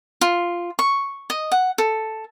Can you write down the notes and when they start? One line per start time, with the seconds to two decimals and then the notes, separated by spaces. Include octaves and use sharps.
0.21 F4
0.79 C#6
1.30 D#5
1.52 F#5
1.78 A4